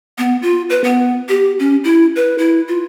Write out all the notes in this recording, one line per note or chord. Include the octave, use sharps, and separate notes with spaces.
B3
F4
B4
B3
G4
C#4
E4
B4
E4
F4